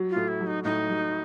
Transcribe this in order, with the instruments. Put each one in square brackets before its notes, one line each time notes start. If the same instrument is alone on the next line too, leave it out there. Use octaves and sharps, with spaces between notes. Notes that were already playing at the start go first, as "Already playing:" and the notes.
Already playing: [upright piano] F#3
[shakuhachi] F4
[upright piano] A2
[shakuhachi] E4
[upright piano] F#3
[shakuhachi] D#4
[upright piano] A2 [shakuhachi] D#4
[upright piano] F#3